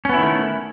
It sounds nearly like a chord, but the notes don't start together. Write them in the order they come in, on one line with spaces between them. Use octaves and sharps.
C#4 B3 E4 D#3 A3